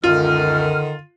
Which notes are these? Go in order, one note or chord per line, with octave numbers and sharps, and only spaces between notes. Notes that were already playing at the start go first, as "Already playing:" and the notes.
C#2 F#2 D3 D#3 F4 F6